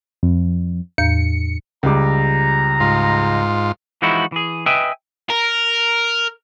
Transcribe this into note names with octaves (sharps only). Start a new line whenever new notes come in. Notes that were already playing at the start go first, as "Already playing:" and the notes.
F2
E2 A2 G6 C#7
C#2 G3 A#5 D6
G#2 F4
E3 F3 G#3 D#4 E4 F#4
E3 G#4
B4 D#5 E5 G5 G#5
A#4